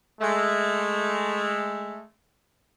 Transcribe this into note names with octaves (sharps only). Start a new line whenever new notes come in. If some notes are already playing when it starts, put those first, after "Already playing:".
G#3 A3